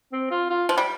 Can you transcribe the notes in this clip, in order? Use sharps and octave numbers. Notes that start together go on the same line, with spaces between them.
C4
F4
F4
F3
G3